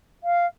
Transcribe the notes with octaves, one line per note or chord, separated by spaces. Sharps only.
F5